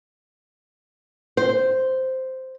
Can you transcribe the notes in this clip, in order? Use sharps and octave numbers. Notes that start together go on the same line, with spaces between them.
C5